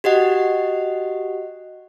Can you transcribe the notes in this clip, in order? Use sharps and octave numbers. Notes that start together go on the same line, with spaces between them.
F#4 G4 D#5 F#5